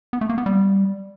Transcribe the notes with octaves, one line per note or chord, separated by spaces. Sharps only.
B3
A3
A#3
B3
G3